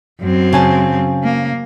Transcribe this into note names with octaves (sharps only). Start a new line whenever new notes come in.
F#2 C4
C#3 G#5 A5
A#3